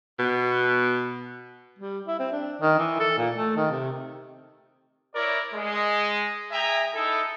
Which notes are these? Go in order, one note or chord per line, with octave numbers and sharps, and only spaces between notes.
B2
G3
E4
C4
D4
D#3
E3
A4
A#2
A3
D#3
C3
E4 A#4 C#5 D5
G#3
G#4 E5 G5 G#5 A#5
D#4 E4 A4